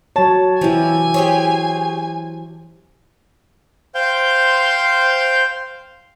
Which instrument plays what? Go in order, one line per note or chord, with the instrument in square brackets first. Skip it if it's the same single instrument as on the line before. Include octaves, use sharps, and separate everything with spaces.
[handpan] F#3 C#5 [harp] A5
[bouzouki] C3 F3 [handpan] E3 E4 G4 [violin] G#5
[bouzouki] G4 G#4 C#5 [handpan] C5
[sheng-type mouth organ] C5 F5 G5 C6 G6